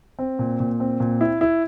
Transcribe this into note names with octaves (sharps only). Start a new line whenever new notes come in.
C4
A#2
A#2
C4
A#2
E4
E4